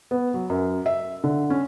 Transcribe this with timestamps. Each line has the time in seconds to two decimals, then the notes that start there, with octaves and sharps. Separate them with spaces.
0.11 B3
0.34 F#3
0.50 F#2
0.86 E5
1.24 D3
1.50 C#4